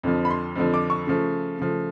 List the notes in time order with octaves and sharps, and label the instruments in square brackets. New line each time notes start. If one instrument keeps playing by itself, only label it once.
[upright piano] F2 D3 F3
B5
C6
F2 D3 F3
D6
C#6
C#3 F3 A3
C#3 F3 A3